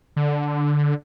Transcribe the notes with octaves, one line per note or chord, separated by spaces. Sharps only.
D3